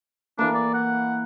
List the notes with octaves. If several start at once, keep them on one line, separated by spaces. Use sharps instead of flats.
E3 A#3 D4
D5
F#5